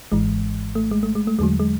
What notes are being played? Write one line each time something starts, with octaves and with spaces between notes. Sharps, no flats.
G#1 G#2 E3 G#3
A3
G#3
A3
G#3
A3
E2 D3 F#3 G#3
G#3